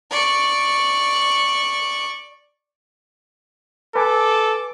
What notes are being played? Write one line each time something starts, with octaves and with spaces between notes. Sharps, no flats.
D5 C#6
A4 B4 G#5 D6